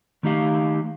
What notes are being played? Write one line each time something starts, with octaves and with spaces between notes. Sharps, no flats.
D#3 A3 D#4 G4 F5